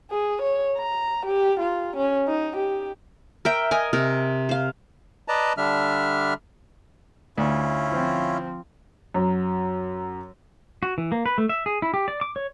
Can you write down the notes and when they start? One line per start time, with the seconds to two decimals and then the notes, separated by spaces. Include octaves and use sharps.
0.11 G#4
0.42 C#5
0.78 A#5
1.26 G4
1.60 F4
1.96 C#4
2.27 D#4
2.57 G4
3.45 A#4 E5 G5
3.71 A#4 D#5 G#5
3.93 C3 A#4
4.49 C5 F5
5.28 B4 D5 D#5 A5 A#5
5.57 D3 G3 D4 E5 F6
7.38 D2 C#4 E4 F4
7.88 F3 C4
9.14 F#2 F#3
10.83 F#4
10.98 E3
11.12 A#3
11.26 B4
11.38 A3
11.49 E5
11.66 G#4
11.82 E4
11.94 G4
12.08 D5
12.21 D6
12.36 C#5